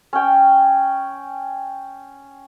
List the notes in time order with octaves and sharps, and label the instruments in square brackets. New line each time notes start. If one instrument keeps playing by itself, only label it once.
[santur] C#4 G5